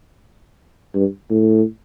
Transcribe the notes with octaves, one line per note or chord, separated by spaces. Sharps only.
G2
A2